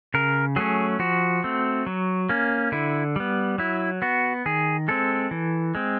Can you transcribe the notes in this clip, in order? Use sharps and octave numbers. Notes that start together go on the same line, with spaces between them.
C#3 A#4
F#3 A3 C#4 G#4
F3 F#4
A3 C4
F#3
A#3 C#4
D3 E4
G3 B3
F#3 E4
B3 F#4
D#3 G#4
G#3 C4 A4
E3
G#3 C4